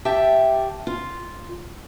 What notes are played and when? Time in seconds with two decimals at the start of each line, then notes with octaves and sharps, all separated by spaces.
0.05 G4 E5 G5 A5
0.87 F4